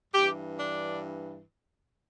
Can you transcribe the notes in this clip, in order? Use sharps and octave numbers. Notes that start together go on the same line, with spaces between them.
G2 E3 G4
D4